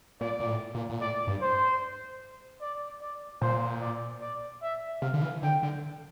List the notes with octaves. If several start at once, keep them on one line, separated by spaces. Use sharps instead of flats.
A#2 D5
A#2
A2
A#2
A#2
A2 D5
G2
C5
D5
D5
A#2 C5
D5
D5
E5
C3 F5
D3
E3
D3 G5
D3